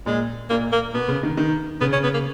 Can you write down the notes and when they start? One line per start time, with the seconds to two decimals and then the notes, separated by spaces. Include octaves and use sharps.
0.06 A#2 G#3
0.50 A#2 A#3
0.73 A#3
0.94 B2 B3
1.08 C#3
1.23 D#3
1.37 D#3
1.81 C#3 B3
1.93 C#4
2.04 B3
2.14 A#3